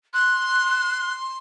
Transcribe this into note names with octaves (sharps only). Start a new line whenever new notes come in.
C6 F#6